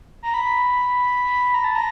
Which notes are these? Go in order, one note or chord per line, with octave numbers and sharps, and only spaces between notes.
A#5
B5
B5
A#5
A5
A#5